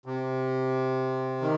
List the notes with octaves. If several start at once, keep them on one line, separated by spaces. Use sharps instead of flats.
C3
D#3